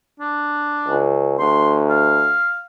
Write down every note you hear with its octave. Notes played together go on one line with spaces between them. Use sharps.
D4
C#2
D2 C6
F5